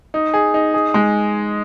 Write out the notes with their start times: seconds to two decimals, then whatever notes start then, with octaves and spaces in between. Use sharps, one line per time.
0.14 D#4
0.34 G#4
0.54 D#4
0.74 G#4
0.94 G#3